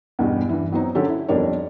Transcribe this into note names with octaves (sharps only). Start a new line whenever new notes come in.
E2 G2 B2 G3
G2 E3
F#3 B3 C4 D#4
D3 F#3 C#4 G4 A4
E4
B1 F2 G3 D4 A#4 C#5